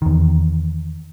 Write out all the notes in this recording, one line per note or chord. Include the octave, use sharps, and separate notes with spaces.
E2 D#3